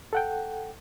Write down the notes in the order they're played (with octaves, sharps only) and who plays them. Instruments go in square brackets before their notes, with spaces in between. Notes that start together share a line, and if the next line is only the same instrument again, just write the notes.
[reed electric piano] A4 F#5 G5